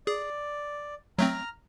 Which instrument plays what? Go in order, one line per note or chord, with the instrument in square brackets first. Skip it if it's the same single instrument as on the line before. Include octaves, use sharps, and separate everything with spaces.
[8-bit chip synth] G#4 [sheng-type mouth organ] D5
[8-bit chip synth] F#3 A3 C4 [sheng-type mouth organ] A#5 F6